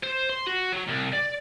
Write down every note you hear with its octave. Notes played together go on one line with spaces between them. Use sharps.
C5
C6
F#4
F#3
C2
D5